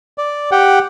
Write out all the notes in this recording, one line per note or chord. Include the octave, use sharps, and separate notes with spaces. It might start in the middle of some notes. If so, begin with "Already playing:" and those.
D5
G4 F#5 G5